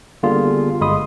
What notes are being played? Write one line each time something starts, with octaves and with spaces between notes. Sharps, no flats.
D3 G3 A#3 B3 F4 G#4
G1 G#3 B5 C6 D#6